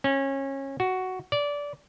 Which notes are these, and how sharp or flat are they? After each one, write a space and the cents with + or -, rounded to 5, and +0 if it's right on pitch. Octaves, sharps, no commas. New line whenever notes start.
C#4 -25
F#4 +5
D5 -20